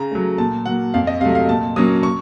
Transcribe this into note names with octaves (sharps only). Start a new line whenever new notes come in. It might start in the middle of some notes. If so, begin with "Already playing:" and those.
Already playing: C#3 A#5
F#3 A3
A#2 A5
F#3 A#3 F#5
F2 F5
D#5
C3 F#3 A3 F5
F5
A#2 A5
F#3 A#3 C#4 D#6
C#6